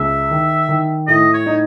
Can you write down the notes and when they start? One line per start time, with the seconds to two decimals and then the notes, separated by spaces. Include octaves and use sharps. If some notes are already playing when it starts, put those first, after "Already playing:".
Already playing: C#2 E5
0.30 D#3
0.69 D#3
1.07 A2 D#5
1.34 C#5
1.46 D#4